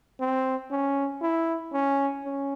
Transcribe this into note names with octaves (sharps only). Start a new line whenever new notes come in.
C4
C#4
E4
C#4
C#4